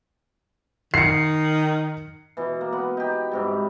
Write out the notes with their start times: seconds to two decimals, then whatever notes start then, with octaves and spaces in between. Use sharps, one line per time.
0.94 D#3 C7 C#7
2.37 B2 E3
2.61 A#3
2.72 B3 F#5
2.97 D#4 G4
3.32 G#2 C3 G3